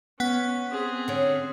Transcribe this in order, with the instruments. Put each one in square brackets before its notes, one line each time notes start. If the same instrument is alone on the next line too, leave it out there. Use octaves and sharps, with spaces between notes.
[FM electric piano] B3 [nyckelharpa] C#4 [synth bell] F#5 F#6 B6
[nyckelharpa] C4 G#4
[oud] D3 C#4